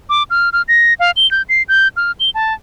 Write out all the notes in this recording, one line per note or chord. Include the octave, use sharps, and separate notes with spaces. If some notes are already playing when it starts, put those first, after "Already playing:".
D6
F6
F6
A#6
F5
G7
G6
C7
G6
F6
G7
A5